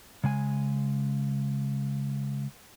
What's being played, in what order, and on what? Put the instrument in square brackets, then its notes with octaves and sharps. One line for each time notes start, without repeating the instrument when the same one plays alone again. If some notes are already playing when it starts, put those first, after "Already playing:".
[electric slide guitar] C#3 G#3 G#5